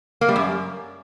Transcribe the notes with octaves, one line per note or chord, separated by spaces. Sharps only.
A#3
G3
F#2